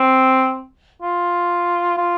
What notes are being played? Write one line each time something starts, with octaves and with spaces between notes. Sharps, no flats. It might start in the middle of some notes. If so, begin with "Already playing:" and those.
Already playing: C4
F4
F4